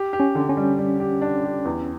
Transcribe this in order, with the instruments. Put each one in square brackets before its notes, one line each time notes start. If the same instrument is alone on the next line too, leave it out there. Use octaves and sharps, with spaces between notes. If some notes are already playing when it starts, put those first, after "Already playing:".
Already playing: [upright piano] G4
G4
[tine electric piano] C#4
[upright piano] D3
[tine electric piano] C#4
[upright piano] G3
G3
G4
D4
G4
E2